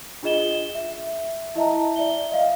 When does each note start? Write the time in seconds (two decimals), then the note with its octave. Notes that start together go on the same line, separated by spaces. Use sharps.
0.23 D4 F4 G#4 D#5 E7 G7
0.75 E5
1.55 E4 D#5 E5 A5 A#5
1.96 D5 E5 G7
2.31 D#5 F5